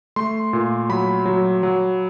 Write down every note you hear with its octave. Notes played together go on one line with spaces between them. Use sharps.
A3 C6
A#2
F#3 B5
F#3
F#3